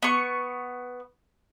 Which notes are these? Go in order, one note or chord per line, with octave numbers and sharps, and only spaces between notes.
B3 C#6